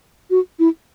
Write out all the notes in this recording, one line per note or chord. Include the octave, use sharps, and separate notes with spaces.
F#4
E4